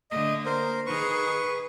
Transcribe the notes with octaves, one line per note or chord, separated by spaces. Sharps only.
D3 A3 D#5
A#3 A#4 C5
D#3 G#4 B4 C#6